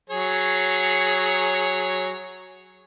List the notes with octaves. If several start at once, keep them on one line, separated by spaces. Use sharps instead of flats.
F#3 G#4 C#5